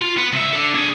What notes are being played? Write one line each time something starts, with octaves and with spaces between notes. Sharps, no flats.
F4
B3
C#2 E5
D4 A4
D4 G#4